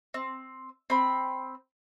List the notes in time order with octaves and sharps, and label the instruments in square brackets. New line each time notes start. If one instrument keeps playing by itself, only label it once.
[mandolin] C4
C4 B5